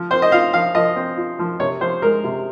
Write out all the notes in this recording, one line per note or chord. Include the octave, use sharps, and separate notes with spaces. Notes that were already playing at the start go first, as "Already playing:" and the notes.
Already playing: F3
C4 C5
D#5
F4 F5
F3 F5
F3 D#5
C4
F4
F3
C3 C#5
F3 C5
G#3 A#4
C3